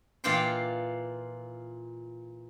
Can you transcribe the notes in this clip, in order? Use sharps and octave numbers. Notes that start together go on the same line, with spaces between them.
A#2 E3 F4 D5 G5 C6